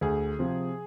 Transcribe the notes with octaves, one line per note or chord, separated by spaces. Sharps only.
D2 G#4
C3 F3